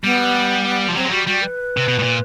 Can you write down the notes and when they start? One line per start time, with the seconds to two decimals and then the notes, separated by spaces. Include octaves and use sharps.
0.04 G3 B3
0.88 F3
0.96 F#3 C4
1.05 G#3
1.11 G3 F#4
1.27 G3 F#4
1.42 B4
1.77 C3
1.88 B2
1.99 A2
2.03 A#2